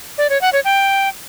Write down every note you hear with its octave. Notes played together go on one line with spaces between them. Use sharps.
D5
C#5
F#5
C#5
G5